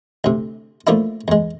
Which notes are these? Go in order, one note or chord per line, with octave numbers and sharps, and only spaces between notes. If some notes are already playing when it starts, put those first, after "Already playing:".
D2 C3
F3 A3 A#3 D4 E4
E2 G#3